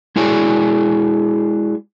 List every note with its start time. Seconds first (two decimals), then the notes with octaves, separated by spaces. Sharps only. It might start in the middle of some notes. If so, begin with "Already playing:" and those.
0.16 G#3 E4 F#4 G#4 C#5 D5